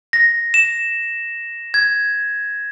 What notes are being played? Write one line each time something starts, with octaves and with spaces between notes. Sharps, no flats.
A#6
E7
G#6